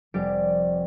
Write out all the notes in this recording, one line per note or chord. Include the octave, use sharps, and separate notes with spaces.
F1 G3 G4 D5 D7